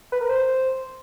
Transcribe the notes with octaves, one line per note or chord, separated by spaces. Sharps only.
B4
A#4
C5